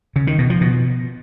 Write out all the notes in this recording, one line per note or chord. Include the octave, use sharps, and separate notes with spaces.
C#3
D#3
B2
F3
B2